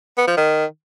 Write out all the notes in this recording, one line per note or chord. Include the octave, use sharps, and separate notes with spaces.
B3
F3
D#3